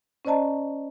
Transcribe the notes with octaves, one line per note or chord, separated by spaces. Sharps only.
C#4 C5 D5 D#5 A5 A#5